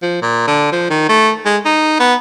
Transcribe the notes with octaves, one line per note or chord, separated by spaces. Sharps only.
F3
A#2
D3
F3
D#3
A3
G#3
D#4
B3